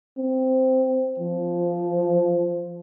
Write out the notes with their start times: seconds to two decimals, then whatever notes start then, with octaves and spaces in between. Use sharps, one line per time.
0.18 C4
1.20 F3